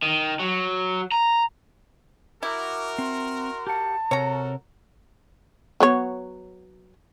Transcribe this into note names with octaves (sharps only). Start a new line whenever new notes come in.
D#3
F#3
A#5
E4 F#4 A#4 D6
C4 C6
G4 F#5 A5
C3 F#4 A4 A#4 C#5 A#5
F#3 B3 C#5